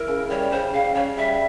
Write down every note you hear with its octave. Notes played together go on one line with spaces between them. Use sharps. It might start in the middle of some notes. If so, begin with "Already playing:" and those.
Already playing: E4 A#4
C#3
G3 C#5
C#3 C5
C#3 F5
C#3 C#5
G3 E5